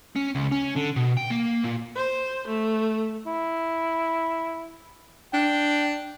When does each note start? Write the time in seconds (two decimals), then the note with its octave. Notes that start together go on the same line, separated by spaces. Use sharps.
0.16 C#4
0.35 C#2
0.52 C#4
0.76 D3
0.96 B2
1.17 G5
1.30 A#3
1.64 A#2
1.95 C5
2.47 A3
3.26 E4
5.33 D4 G5